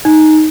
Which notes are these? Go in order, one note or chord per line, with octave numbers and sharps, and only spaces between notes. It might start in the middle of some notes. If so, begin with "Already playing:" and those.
D#4